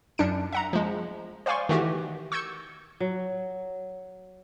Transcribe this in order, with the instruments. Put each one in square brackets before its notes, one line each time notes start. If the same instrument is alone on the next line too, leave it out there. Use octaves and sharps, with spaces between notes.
[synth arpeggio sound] F#2 D4 C#7 D7
E5 F#5 A#5
F3 G#3
C5 D5 F5 G#5 C6 C#6
D#3 E3 A3 F#4 G4
C#6 E6 G6 G#6 C#7
[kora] F#3